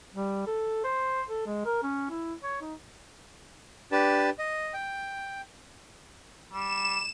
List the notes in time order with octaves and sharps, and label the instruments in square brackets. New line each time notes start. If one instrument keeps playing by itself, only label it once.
[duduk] G3
A4
C5
A4
G#3
A#4
C#4
E4
C#5
D#4
[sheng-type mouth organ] D4 G4 B4 A5
D#5
G5
[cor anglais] G3 [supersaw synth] E7